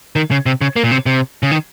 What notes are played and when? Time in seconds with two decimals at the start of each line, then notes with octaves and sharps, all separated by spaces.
0.16 D#3
0.31 C#3
0.46 C3
0.61 C#3
0.76 A#3
0.84 A#2
0.91 C3
1.06 C3
1.43 C#3
1.51 D#3